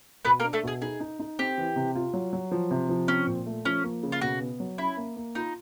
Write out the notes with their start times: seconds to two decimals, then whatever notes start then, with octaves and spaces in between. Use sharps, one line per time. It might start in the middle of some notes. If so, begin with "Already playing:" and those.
0.25 B2 B3 B4
0.40 A#3 A#4
0.44 D4
0.53 A3 A4
0.63 B2 G#4
0.82 D#4 G#4
1.00 D#4
1.19 D#4
1.39 C4 G4
1.58 E3
1.76 C3
1.95 F4
2.13 F#3
2.33 F#3
2.52 F3
2.71 C3
2.89 F3
3.08 C4 C#4
3.27 A#2
3.46 A3
3.65 F3 C#4
3.84 A#3
4.03 C#3
4.12 F4
4.21 B2 F#4
4.40 B3
4.60 F#3
4.78 C#4 E4
4.97 A#3
5.16 A#3
5.35 D#4 F4